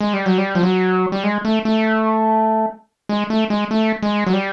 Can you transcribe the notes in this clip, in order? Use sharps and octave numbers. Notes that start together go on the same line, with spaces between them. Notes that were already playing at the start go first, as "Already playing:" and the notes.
G#3
G3
F#3
G3
F3
F#3
G3
G#3
A3
A3
G#3
A3
G#3
A3
G#3
F#3
G3